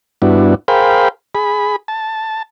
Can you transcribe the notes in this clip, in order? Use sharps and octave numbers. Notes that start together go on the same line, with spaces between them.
G2 B3 D4 E4 F#4
G#4 A#4 C5 F5 G5 B5
G#4 B5
A5